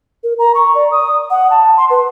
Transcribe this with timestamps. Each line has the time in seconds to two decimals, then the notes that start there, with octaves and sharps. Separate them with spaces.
0.24 A#4
0.39 A#5
0.55 C#6
0.75 D5
0.91 D#6
1.30 F#5
1.50 A5
1.77 C6
1.90 B4